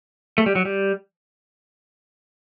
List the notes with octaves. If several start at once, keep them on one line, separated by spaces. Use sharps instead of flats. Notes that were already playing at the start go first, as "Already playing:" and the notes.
A3
G3
F#3
G3